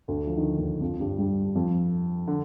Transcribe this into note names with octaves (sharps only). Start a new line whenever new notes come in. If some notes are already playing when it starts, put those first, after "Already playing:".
D2 D3
F3
D#3
D3
D#2 D#3
F2 F3
G2 G3
G2 G3
F2 F3
D3